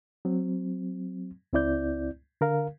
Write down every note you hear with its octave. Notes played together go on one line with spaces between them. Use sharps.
F#3 C4
C#2 C4 E4 D5 G6
D3 A#4 F5